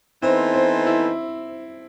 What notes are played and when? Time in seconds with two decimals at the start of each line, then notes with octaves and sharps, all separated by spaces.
0.22 E3 B3 C4 D#4 A4 C5
0.54 C4
0.86 E4